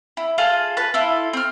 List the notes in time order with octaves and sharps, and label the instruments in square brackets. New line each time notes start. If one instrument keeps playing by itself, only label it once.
[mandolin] E4
F4 G#4 A4 F5
B4 A5
E4 F4 A4
C4 F6